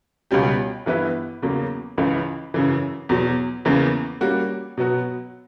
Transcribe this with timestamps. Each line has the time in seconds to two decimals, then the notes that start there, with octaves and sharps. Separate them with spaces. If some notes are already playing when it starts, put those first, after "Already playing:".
0.31 C#2 B2 G3 C#4 G4
0.86 G2 E3 B3 E4 B4
1.42 E2 C#3 F#3 A#3
1.98 C#2 C#3 E3
2.54 F#2 C#3 E3
3.09 E2 B2 F#3
3.65 E2 C#3 E3 A#3
4.21 G3 A#3 C#4 F#4
4.77 B2 F#3 B3 F#4